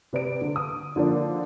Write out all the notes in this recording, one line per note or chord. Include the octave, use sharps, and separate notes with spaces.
C3 B4 D5 D7
D3
D#6
D3 F3 A#3 D4